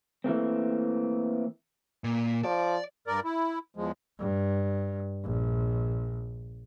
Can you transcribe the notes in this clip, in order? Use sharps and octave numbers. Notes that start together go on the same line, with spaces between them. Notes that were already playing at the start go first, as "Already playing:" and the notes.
E3 A3 A#3 C4
A#2
F3 D5
G2 A#4 D5
E4
E2 F3 G#3
G2
A#1